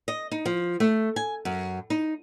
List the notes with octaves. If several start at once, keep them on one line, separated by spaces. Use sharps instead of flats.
D#5
D#4
F3
A3
G#5
F#2
D#4